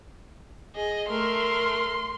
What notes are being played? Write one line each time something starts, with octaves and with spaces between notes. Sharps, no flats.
G#4 D#5
A3 A#4 C6